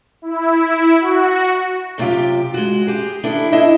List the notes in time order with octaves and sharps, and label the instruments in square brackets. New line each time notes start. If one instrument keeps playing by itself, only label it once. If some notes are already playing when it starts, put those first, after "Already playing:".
[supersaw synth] E4
F#4
[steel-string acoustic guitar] F#2 C3 F4 G4
G#3 F#4
G4 G#4
D#3 B3 D4 E4 A4
D4 E4 D#5 E5